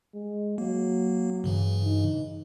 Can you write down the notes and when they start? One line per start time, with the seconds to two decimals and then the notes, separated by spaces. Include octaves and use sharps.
0.14 G#3
0.58 F#3 A#3
1.44 G2 C#3 E3
1.84 D#4